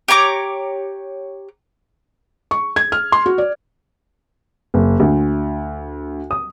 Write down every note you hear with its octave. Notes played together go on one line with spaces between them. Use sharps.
G4 C#5 A#5 D6
C#6
G#6
F6
C6
F#4
D5
F#1
D2
D#6